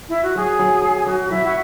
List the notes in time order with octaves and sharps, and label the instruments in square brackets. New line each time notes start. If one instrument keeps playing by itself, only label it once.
[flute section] E4
F#4
[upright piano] F#3 [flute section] G#4
[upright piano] F#3
F#3
[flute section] G#4
[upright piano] F#3 [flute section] F#4
[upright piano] F#3 [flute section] E4
[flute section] F#4